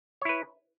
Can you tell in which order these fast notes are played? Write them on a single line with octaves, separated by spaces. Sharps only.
C#5 E4 B4